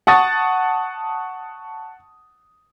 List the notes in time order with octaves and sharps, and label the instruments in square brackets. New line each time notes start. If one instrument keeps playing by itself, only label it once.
[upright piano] F#5 A5 C#6 D#6 A6